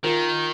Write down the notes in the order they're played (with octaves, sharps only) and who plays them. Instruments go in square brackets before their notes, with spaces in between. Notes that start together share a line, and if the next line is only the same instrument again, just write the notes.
[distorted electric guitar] D#3 [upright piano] F4 A#4